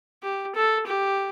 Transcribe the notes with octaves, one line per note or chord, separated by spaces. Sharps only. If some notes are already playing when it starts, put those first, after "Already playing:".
G4
A4
G4